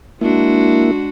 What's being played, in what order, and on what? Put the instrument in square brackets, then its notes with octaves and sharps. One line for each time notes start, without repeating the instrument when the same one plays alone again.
[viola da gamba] G#3 D4 F#4 [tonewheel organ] A#3 E4